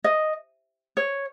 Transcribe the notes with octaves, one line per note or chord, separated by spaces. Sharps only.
D#5
C#5